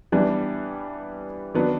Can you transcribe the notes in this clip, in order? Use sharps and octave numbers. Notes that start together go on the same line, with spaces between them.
E3 G3 B3 D4
D#3 F#3 B3 D4